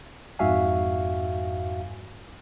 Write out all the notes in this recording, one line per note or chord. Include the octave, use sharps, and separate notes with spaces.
F2 G#2 F#4 E5 F5 G#5